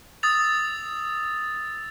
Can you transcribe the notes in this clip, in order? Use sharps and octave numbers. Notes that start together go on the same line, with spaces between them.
D#6 E6 A6 F7